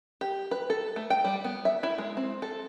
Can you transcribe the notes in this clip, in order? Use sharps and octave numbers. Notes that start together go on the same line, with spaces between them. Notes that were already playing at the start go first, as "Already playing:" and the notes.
G4
B4
A4
A3
G5
G3
B3
E5
E4
G#3
C4
A4